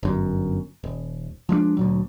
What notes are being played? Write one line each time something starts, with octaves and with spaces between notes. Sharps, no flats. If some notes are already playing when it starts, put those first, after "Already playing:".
G1 F#2
D#1
F3 G#3 A3 D4
D2 A#2 F#3